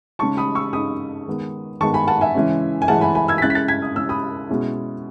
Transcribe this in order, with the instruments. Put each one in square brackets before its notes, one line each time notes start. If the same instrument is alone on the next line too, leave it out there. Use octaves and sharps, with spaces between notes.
[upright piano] C#3 G#3 D#4 A5 C#6
B5 D#6
C#6 E6
C#3 G#3 D#4 B5 D#6
D#3 G#3 B3
D#3 G#3 B3 A5 C#6
G#5 B5
F#5 A5
E5 G#5
C#3 E3 G#3 C#4
G#5
C#3 E3 G#3 C#4 F#5 A5
G#5 B5
G#5 B5
E6 G#6
B6
C#3 G#3 C#4 E4 F#6 A6
B6
F#6 A6
G#6 B6
D#6
C#3 G#3 C#4 E4 E6
B5 D#6
B2 G#3 C#4 E4